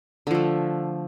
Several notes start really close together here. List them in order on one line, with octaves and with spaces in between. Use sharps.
D3 F3 A3